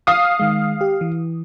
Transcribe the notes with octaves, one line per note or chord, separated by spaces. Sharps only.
F5 D#6
D#3 G#3
G4
E3